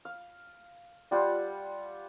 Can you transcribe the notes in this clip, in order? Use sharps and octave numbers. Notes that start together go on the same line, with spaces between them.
F5
G3 F4 C5 F#5